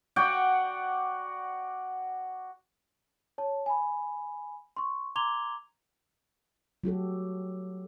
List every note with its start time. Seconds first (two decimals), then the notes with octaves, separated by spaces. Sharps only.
0.16 F#4 D5 F#5 G5
3.38 C#5 A5
3.66 G#5 B5
4.77 C6 C#6
5.16 A#5 C6 D6 G#6 F7 G7
6.84 F#3 F#4 G4 A4